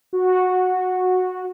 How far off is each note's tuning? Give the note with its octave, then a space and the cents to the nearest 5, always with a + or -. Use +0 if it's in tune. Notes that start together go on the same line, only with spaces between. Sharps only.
F#4 -10